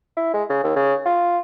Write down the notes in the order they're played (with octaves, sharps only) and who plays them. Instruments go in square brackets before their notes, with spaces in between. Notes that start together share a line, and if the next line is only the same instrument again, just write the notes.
[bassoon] E4
G#3
C#3
D#2
C#3
F4